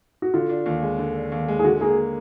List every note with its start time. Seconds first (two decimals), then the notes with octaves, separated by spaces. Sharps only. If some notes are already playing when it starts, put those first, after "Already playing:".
0.22 F#4
0.34 D3 F4
0.49 D4
0.66 D#2
0.83 G#3
0.99 D3
1.16 D4
1.32 D#2
1.48 G#3
1.59 G#4
1.64 D3 F#4
1.81 A#3 G#4